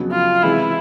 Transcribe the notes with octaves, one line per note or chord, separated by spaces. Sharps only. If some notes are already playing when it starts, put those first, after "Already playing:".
Already playing: F2 C#3 F#3 B3
F4
C3 E3 G#3 E4